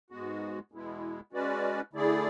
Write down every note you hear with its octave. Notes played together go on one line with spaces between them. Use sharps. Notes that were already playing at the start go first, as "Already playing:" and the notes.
G#2 G#3 B3 F#4
E2 B2 G#3 B3 E4
G#3 C#4 F#4 B4 D5
D3 A3 E4 G#4 D5